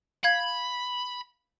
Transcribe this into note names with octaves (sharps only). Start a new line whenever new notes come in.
F5 B5 G#6